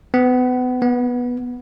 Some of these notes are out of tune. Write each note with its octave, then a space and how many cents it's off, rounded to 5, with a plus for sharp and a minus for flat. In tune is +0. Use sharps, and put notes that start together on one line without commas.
B3 +30
B3 -10